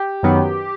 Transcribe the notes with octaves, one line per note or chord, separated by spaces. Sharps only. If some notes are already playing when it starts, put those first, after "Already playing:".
Already playing: G4
F#2 D#3 F#3 B3